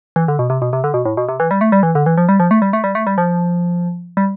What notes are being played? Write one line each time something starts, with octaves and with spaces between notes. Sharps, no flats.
E3
D3
B2
C3
B2
C3
D3
B2
A2
B2
C3
E3
G3
A3
G3
E3
D3
E3
F3
G3
F3
A3
G3
A3
G3
A3
G3
F3
G3